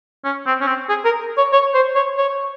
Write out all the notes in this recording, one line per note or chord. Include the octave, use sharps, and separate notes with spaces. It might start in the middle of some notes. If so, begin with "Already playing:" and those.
C#4
C4
C#4
C4
G#4
A#4
C#5
C#5
C5
C#5
C#5